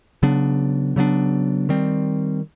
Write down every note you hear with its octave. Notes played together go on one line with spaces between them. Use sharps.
C#3 F#3 B3 D4
C#3 F#3 B3 D4
D#3 G3 C4